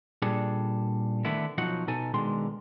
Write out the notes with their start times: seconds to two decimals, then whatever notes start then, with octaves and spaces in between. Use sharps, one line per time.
0.22 A#2 G3 D4 G#4 A4
1.25 D3 D#3 A3 B3 E4
1.58 B1 F3 F#3 D#4 F#5
1.88 B2 D#4 A4 G#5
2.14 B2 D3 D#3 G#3 C6